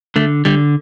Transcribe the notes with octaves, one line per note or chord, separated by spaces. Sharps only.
D3 A3
D3 G3